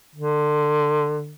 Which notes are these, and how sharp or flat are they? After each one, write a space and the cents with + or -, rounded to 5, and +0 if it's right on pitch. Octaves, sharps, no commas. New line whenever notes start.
D3 +25